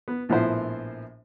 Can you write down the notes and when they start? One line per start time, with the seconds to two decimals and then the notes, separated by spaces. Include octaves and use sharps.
0.08 B3
0.29 A#1 A2 F3 B3 E4 C5